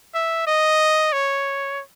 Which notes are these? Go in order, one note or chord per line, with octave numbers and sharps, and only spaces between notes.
E5
D#5
C#5